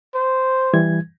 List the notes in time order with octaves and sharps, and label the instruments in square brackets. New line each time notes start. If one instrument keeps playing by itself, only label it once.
[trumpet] C5
[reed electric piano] E3 G3 G#6